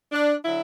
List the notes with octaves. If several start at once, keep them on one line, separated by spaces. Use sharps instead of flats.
D4
D3 F#3 E4